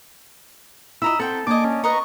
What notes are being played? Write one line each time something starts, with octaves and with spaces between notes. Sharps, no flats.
E4 F4 D#5 A#5 B5 E6
C4 A4 C5 F#5 G5
A#3 D4 D#5 G#5 A5 D6
C#4
B4 D#5 A#5 C#6